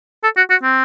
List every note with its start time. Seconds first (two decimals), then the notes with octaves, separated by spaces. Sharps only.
0.24 A4
0.37 F#4
0.50 F#4
0.63 C4